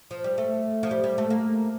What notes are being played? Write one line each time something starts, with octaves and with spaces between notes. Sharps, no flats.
F3
G3
A3
F3
G3
G3
A3
A#3